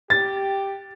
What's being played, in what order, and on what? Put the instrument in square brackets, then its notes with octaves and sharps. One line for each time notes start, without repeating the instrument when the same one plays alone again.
[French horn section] G4 [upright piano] A6